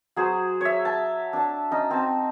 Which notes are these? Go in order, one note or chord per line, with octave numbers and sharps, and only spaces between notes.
F#3 G#4 C5
C#5 E5
A5
D4 A5
C#4 D#4
C4 A5